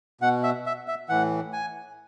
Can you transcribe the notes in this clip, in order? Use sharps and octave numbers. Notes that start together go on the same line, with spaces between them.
B2 F#5
E5
E5
E5
A2 E3 F#5
G#5